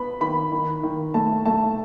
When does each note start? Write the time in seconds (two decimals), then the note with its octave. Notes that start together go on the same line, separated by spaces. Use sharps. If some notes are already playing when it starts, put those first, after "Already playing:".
Already playing: B3 B5
0.20 D#3 B5
0.51 D#3
0.83 D#3
1.14 A3 A5
1.45 A3 A5